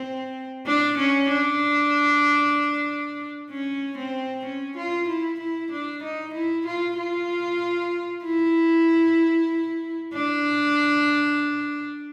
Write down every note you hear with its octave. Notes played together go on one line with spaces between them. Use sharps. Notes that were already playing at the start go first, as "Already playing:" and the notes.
Already playing: C4
D4
C#4
D4
C#4
C4
C#4
F4
E4
E4
D4
D#4
E4
F4
F4
E4
D4